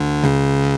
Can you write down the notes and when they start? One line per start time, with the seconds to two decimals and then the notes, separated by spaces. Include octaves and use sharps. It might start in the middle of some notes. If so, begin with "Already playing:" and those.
Already playing: D2 D3
0.23 C#2 C#3